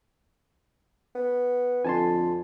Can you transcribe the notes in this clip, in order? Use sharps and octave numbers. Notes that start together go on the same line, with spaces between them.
B3
F2 D3 G#5 A5 C6